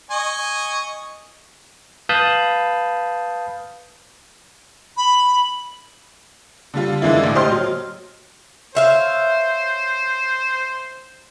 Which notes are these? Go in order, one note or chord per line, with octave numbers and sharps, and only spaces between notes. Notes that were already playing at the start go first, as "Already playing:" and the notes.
D#5 G#5 C#6
B4 F5 A5 B5 D#6 G6
B5
D3 G3 F4
D3 E3 G#3 A#3 E4
A#1 A2
G4 C5 D#5 C6 F6
F#3
C5 C#5 E5 F5